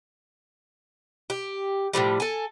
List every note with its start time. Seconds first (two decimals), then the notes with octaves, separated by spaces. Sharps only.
1.30 G4
1.93 A2 D3 F3 G3
2.20 A4 G#5